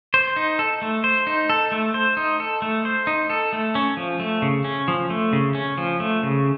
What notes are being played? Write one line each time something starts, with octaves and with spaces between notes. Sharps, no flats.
C5
D#4
A4
A3
C5
D#4
A4
A3
C5
D#4
A4
A3
C5
D#4
A4
A3
C#4
F3
A3
C#3
C#4
F3
A3
C#3
C#4
F3
A3
C#3